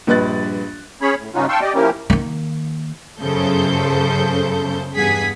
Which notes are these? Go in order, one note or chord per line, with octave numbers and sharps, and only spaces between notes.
A#1 G2 B4 D#5 F#6 A6
C#4 G#4 C#5 B5
A2
G2 C#3 C#4 D#4 F4 F#4
F5 G5 A5 C6 C#6 E6
G4 D5 D#5
F3 A#3 C#4 E4 G4 A#4
D#3 A#3
G1 F#2 C#3 A4 C5 G6
E2 G2 G#4 F#5 G#6 B6